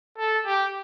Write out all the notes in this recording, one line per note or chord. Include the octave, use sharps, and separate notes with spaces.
A4
G4